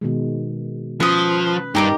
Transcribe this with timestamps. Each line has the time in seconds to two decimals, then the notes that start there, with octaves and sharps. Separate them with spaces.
0.01 B2 D#3 G#3
1.00 F3 C#4 B4 D#6
1.75 G2 D#4 G4 A#4 D6